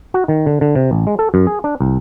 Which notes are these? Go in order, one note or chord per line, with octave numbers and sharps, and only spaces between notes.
F#4
D#3
D3
D3
C3
A1
G#3
A4
F#2
G#4
D4
C2